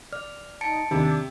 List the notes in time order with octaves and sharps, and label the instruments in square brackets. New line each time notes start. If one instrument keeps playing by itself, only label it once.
[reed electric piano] D5 [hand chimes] F6
[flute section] D#4 [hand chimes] A5 C#7 D7
[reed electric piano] D#2 D#3 [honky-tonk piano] C3 [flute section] D4